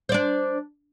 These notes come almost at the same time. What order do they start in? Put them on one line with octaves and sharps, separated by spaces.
C5 D5 D4